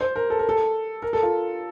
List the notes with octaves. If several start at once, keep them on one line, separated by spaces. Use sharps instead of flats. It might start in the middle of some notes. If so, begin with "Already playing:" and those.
C5
A#4
A4
A#4
A4
A#4
A4
F4